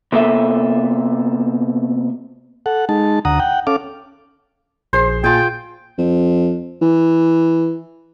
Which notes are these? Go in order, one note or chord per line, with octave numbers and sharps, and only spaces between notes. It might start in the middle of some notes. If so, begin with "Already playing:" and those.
C3 A#3 B3 A4 E5
A4 F#5
G#3 D#4 A5
D2 F#5 A#5 D#6
F#5 G5
C#4 A4 F5 D6
A#1 G#4 C5 C7
A#2 F4 G#4 G5 A6
F2
E3